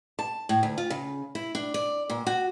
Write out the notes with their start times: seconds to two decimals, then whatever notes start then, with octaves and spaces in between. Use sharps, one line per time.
0.19 A5
0.49 A2
0.63 D2
0.78 F4
0.90 C#3
1.35 E4
1.55 D4
1.74 D5
2.10 A#2
2.27 F#4